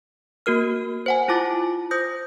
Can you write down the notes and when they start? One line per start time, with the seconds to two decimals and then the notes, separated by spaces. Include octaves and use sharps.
0.46 A#3 F#4 A#4 F6
1.06 C5 F#5 G#5
1.28 E4 F4 A5 D6 A6
1.91 C5 D#6 G6 A#6